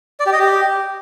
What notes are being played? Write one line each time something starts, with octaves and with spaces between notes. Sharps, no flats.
D5
G4
D#5
G4